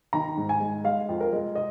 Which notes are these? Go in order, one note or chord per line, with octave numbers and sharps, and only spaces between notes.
D#3 A#5
G#2
G#5
G#3
G#3 F5
F2
A#4
G#3
D#5